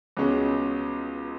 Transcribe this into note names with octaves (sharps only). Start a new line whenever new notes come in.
C#2 B2 G#3 C#4